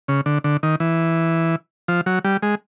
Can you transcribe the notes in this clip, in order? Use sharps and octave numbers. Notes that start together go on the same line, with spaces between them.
C#3
D3
D3
D#3
E3
F3
F#3
G3
G#3